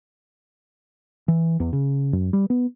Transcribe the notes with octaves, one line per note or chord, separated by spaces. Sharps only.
E3
E2
C#3
F#2
G3
B3